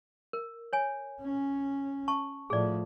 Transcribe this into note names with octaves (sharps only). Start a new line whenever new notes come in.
A#4
C#5 G#5
C#4
A5 C#6
A2 F3 G#4 D5